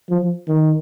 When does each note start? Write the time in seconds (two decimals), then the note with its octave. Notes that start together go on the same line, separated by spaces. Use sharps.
0.10 F3
0.48 D#3